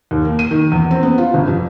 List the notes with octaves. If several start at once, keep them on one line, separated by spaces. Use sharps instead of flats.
D#2
A#3
D#7
D#3
E2
C4
B3
F4
G1
F2